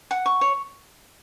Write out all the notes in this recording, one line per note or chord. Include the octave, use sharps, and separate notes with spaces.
F#5
C#6
C#5